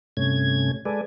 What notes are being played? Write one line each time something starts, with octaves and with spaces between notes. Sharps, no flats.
G2 C3 A3 C#4 G#6
G#3 A4 B4 D5 G#5